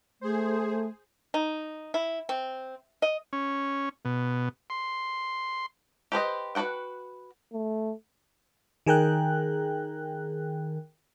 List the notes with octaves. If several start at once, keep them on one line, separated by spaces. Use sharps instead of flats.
A3 G#4 C5
D#4
E4
C4
D#5
C#4
B2
C6
G4 B4 C5 D#5
F#4 B4 C5 F#5 G5
A3
D#3 G#4 A#4 G5 F#6